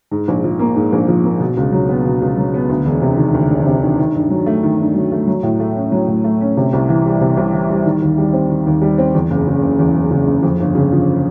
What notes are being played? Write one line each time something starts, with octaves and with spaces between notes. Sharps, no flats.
G#2
A#1
F3
A#3
G#2
A#1
F3
A#3
B2
C#2
F#3
B3
B2
C#2
F#3
B3
D2
E1
C3
D#3
D2
E1
C3
D#3
D#3
G2
F#3
A3
D#3
G2
F#3
A3
F#3
A2
A3
C#4
F#3
A2
A3
C#4
C3
C2
E3
G3
C3
C2
E3
G3
D#3
D#2
G3
C4
D#3
D#2
G3
C4
E2
F#1
C#3
F#1
E2
F#1
C#3
F#1
F2
G1
C#3
F3